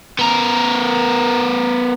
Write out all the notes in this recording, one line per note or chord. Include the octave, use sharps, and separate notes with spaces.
B3 A#4